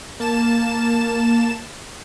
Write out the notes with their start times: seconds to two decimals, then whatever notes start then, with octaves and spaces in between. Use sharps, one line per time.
0.20 A#3 A5 E7